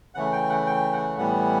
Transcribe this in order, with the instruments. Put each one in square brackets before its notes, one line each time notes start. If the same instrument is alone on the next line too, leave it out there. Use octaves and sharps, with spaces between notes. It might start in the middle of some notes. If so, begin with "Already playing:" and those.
[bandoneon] C#3 E3 A3 F#5
G5
F#5
G5
F#5
A2 E3 G3 B3 F#5